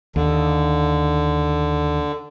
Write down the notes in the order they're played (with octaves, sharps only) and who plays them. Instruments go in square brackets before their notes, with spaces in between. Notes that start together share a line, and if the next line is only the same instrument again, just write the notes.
[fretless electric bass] D#2 [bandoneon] D3